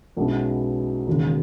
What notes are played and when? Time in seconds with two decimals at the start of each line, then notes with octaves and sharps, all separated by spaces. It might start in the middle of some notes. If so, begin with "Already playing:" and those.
0.17 B1 B2 G#3 C#4 E4
1.07 E1 D#2 C#3